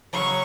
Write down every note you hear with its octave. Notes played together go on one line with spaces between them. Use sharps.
C#3 F#3 C#4 G#4 C#6